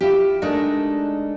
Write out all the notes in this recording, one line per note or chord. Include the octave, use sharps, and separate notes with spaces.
E4 F4 G4
G#3 A3 D4 D#4 A#4